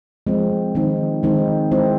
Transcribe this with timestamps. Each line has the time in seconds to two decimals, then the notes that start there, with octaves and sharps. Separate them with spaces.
0.27 F3 G#3 C4
0.75 D#3 G#3 C4 D#4
1.23 D#3 G#3 C4 D#4
1.72 G#3 C4 E4